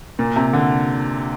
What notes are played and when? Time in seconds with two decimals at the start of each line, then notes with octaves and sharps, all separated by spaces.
0.19 A#2
0.36 C3
0.53 D3